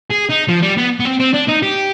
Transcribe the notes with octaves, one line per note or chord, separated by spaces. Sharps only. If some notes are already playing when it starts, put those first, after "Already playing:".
G#4
D#4
F3
G3
B3
B3
C4
C4
D4
D#4
G4